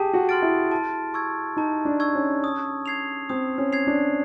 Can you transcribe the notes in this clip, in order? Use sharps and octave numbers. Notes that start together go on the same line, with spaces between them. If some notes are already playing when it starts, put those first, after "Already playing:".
Already playing: G4 G#4 A5
F#4
C6 F6 A6 D7
E4
A5
C#6 E6 G#6
D#4 A5
D4
C#6 E6 G#6
C#4
D#6
G#6 C7 F7
C4 D#6
C#4
G#6 C7 F7
D4